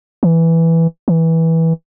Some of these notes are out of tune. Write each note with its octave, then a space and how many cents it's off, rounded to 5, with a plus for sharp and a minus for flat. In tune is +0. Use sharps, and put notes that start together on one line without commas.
E3 +0
E3 -15